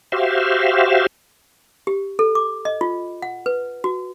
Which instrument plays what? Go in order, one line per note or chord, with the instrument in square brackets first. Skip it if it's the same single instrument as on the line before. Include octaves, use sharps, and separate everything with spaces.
[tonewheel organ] F#4 G4 C5 E5 F5
[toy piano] G4
A4
D6
D#5
F4
F#5
B4
F#4